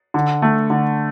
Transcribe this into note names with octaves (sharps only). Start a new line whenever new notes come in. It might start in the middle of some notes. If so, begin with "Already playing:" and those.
D3
A3
D3